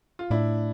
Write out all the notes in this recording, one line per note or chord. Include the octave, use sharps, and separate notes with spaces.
F4
A2 D4 E4